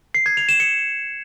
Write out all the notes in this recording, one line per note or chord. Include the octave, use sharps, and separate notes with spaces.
C7
G#6
F7
E7
C#7